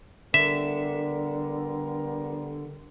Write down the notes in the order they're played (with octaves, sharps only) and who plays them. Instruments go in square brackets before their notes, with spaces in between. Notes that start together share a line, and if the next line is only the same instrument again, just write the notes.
[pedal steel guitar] D3 [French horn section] G3 B3 A#4 [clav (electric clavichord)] E5